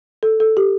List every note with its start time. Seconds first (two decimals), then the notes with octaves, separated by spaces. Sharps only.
0.23 A4
0.40 A4
0.57 G4